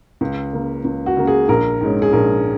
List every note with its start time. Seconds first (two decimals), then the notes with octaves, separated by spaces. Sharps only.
0.21 C#2
0.53 C#3 A#3
0.85 C#2
1.06 F#4
1.17 C#3 A#3
1.27 G#4
1.49 A#1 A#4
1.81 G#2 G#3 C#4
2.02 G#4
2.13 A#1 A#4